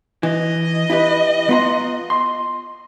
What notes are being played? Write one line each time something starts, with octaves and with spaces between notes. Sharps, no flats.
E3 D#5
E4 G4 B4
B3 F4 A#5
C6